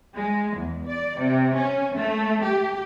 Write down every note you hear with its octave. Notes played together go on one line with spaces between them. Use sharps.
G#3
E2
D5
C3
C#4
A3
G4